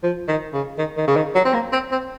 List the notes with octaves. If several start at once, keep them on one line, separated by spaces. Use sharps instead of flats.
F3
D#3
C#3
D#3
D#3
C#3
D#3
F#3
C4
A#3
C4
C4